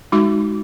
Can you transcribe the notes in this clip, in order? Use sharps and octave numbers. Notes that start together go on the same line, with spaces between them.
G#3 D#4 F#4